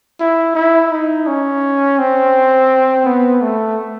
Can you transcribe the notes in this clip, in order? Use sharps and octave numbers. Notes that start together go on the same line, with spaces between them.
E4
E4
D#4
C#4
C4
B3
A3